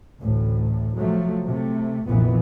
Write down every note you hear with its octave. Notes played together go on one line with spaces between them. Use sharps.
A1 D2 A2
C3 F3 F#3 A3
C3 A3
F1 A#1 F2 A#2 E3 B3